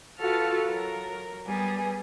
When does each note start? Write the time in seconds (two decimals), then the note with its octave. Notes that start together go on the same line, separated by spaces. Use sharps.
0.18 F4 F#4 A4 B4 A5 F6
0.68 F#3 A#4
1.47 G3 B3 G#4